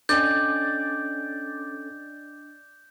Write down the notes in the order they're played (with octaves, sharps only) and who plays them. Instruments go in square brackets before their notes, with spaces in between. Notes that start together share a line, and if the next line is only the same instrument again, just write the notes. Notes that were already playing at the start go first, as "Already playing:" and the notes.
[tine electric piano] C#4 A4 [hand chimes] D4 D#5 G5 [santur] D5 [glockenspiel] G6